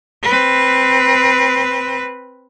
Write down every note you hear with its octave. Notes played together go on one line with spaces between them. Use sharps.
C4 B4